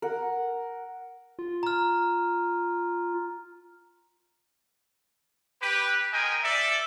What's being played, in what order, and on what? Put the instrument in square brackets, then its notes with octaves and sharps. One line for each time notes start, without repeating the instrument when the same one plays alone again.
[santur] A#4 F#5
[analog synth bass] F4
[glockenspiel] A#5 F6
[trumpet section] G4 B4
G#3 A#4 D#5 G5 G#5
A4 D5 E5